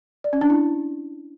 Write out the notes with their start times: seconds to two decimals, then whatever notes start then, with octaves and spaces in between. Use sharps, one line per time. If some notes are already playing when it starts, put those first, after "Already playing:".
0.24 D5
0.33 C#4
0.41 D4
0.50 E4